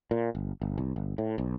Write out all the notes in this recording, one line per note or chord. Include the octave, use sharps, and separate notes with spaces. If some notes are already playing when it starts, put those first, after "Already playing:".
A#2
G1
G1
C2
G1
A2
B1